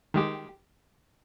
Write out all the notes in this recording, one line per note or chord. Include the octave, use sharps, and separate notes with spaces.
D#3 G#3 G4